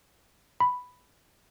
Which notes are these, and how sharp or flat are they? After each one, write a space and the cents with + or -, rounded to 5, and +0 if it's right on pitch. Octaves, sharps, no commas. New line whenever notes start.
B5 +5